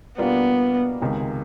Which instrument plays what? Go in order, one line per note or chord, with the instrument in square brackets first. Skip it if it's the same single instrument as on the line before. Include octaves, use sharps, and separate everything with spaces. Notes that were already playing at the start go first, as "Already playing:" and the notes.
[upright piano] B2 G3 A#3 D4 F4 [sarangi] B3
[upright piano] C#2 C3 D#3 G#3